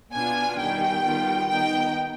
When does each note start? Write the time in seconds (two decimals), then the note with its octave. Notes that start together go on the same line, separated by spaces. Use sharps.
0.13 B2 B3 D4 F4 G#5
0.58 D#3 G3 B3 D#4 G5
1.04 D#3 G3 B3 F4
1.50 D#3 B3 D#4 G5